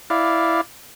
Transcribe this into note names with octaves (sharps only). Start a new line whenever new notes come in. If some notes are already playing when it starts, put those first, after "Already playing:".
E4 D5 F5